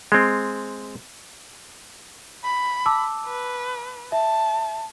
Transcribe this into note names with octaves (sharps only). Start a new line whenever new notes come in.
G#3 C4
B5
A5 D6 E6
B4
E5 A5